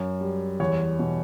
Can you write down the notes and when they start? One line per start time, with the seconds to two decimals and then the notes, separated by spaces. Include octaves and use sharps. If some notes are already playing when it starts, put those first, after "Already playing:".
Already playing: F#2
0.21 G3
0.60 E2 C#5
0.99 B2